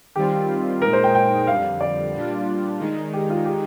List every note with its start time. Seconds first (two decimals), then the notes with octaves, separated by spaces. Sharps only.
0.16 D#3 G3 C4 F4 G4
0.82 A#2 G#3 D#4 A#4
0.93 C5
1.04 G5
1.15 G5
1.47 F2 D3 G3 F5
1.81 D5
2.14 A#2 G3 D4 F4
2.80 D#3 G#3 D#4
3.13 G4
3.30 F4
3.46 G4